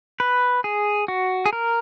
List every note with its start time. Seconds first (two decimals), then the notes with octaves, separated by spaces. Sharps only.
0.20 B4
0.64 G#4
1.08 F#4
1.46 G#4
1.53 A#4